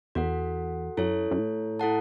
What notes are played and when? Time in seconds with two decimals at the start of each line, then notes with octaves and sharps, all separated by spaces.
0.15 E2 F#4 A4 F#5
0.97 F#2 E4 A4 C#5
1.31 F#2
1.39 A2
1.79 E4 A4 F#5 A5